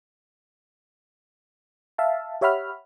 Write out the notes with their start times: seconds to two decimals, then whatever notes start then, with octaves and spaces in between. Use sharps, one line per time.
1.98 E5 F5 A5
2.41 G4 C#5 E5 F#5 B5 F6